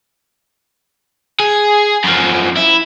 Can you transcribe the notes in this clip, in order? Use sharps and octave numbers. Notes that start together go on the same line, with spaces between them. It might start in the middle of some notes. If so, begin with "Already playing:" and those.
G#4
F#2 F3
E4